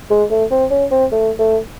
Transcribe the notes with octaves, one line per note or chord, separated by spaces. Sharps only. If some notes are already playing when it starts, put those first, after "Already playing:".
G#3
A3
C4
C#4
C4
A3
A3